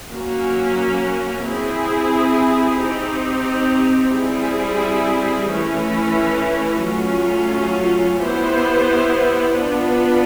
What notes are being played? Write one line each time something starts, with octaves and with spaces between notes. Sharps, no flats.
F#3 A#3 C#4 F#4
C4 E4 G#4
C4 D#4 G4
G3 C4 E4 G#4
E3 A3 C#4 E4
F#3 A3 C#4 F4
B3 E4 G4 C5
B3 D4 F4